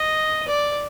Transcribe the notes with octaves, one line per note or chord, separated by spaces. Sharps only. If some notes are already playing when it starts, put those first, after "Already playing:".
Already playing: D#5
D5